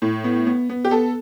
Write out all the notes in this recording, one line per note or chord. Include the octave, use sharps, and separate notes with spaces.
A2
B3
B3
B3
G4
B3 A4